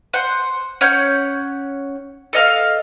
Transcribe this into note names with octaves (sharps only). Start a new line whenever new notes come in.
C5 F#5
C#4 C#5 F#5 G6
A4 D#5 F5